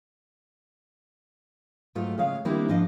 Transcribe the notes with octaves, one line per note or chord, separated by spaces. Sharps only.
G#2 F#3 A3 F4
C#3 G#3 C#4 F5
D#3 G3 A#3 C4 D4 E4
G#2 F3 D4 F4 D#5